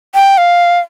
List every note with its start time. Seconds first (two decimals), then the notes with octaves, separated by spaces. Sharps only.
0.15 G5
0.38 F5